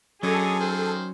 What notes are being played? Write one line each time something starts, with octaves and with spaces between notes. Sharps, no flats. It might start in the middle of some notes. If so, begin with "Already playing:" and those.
D3 F#3 C#4 G#4 A4 C#5 D#5
D#3 C5